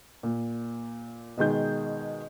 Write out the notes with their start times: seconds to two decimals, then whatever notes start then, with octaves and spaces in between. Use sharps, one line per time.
0.23 A#2
1.37 B2 D#3 G#3 G6